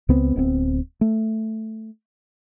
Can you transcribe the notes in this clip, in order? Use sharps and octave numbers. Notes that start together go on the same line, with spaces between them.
C#2 B3 C4
D1 B3 C4
A3